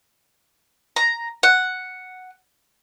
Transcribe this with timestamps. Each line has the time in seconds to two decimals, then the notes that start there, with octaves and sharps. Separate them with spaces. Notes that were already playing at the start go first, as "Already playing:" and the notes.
0.96 A#5
1.43 F#5